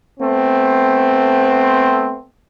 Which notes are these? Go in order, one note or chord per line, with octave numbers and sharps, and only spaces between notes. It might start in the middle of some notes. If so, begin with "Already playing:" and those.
A3 B3 C4